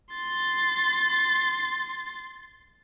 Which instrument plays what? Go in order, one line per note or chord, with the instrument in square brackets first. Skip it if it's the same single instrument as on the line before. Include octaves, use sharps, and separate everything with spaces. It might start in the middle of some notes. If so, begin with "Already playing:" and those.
[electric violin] C6 A6